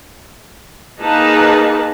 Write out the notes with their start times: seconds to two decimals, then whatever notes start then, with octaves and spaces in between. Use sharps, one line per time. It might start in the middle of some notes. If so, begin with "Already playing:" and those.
1.00 A#3 D#4 G#4 B4 A5